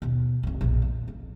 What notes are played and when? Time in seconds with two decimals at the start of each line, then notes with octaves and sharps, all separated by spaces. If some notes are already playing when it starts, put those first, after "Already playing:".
0.02 D#2 B2
0.43 F1 F2
0.61 A#1 F2
0.82 A#2
1.08 F2